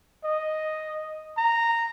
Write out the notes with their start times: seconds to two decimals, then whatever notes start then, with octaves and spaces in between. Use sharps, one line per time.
0.24 D#5
1.38 A#5